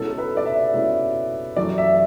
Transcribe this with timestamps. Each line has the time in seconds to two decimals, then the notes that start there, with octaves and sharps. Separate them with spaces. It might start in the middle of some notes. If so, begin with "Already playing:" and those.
Already playing: B2 G#3 C#4 E4 A4
0.10 A4
0.18 B4
0.37 D5
0.46 E5
0.73 B2 G#3 C#4 E4 E5
1.57 F#2 E3 A3 D5
1.78 E5